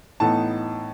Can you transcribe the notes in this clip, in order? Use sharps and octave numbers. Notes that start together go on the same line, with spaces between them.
A2 E3 B3 D#4 A5